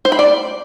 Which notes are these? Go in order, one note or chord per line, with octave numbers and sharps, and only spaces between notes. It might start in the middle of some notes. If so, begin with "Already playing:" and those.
C5
B5
D5